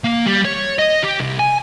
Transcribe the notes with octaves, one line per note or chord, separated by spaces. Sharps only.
A#3
G3
C#5
D#5
G4
C2
G#5